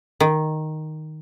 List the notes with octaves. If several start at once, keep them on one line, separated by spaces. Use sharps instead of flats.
D#3